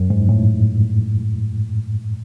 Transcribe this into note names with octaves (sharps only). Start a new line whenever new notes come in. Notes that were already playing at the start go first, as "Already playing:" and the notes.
Already playing: F#2
G#2
A2